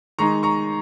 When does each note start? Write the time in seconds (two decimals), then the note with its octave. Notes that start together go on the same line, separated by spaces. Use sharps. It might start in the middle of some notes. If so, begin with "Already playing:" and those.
0.19 D#3 G#3 D#4 A#5 C#6
0.43 A#5 C#6